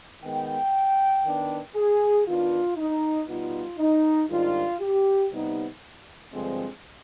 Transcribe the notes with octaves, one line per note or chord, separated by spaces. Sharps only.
D#3 G#3 B3 G5
D#3 B3 D4
G#4
D#3 B3 D4 F4
D#4
B2 G3 B3 D#4 F4
D#4
G#2 D#3 G3 D4 F4
G4
C3 G3 B3 D#4
G2 D3 F3 G#3 C4